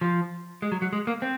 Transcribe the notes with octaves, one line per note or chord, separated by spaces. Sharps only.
F3
G#3
F#3
F#3
G#3
A#3
C4